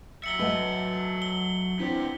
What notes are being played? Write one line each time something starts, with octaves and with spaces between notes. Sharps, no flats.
F#3 E5 C#7 F#7 G7
A3 B4 D#5 F#5
G7
E3 B3 C4 D4 G4